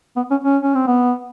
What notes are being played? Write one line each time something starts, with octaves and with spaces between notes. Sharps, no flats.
B3
C#4
C#4
C#4
C4
B3